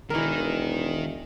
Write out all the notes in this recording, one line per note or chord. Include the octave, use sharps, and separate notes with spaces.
E1 D#3 E3 D#4 A#4